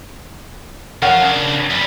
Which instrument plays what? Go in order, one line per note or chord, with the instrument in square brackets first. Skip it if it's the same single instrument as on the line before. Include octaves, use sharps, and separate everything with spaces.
[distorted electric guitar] F3 F5 [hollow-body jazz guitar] A#4 C#5 F#5
[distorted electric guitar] C#3 D4
F#2 G3